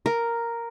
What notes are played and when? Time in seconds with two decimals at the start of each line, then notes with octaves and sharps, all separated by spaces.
0.06 A#4